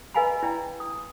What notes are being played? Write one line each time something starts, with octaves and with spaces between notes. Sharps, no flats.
B4 D#5 F5 G#5 A#5 B5
E4 D5 G5 A#5
D#6